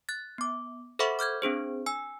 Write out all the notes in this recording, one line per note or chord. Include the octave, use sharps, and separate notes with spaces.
F#6 A6
B3 D6
A4 C5 E5 F#5 B5 C#6
D6 F6 G6 G#6
C4 D4 G#4 C5
G#5 E6